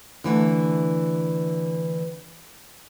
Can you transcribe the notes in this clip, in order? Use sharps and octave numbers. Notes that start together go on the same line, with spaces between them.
D3 E3 A3